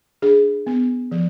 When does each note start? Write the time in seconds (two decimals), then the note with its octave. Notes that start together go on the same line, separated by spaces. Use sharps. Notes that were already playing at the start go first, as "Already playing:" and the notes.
0.22 D4 G#4
0.67 B3
1.11 F3